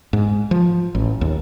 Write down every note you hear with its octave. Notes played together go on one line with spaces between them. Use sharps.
G#2
F3
A1
D#2